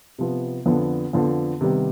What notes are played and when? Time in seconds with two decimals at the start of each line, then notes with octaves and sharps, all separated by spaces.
0.19 C3 F3 B3
0.66 F2 D3 F3 B3
1.13 F2 D3 F3 B3
1.61 C3 D#3 G3 B3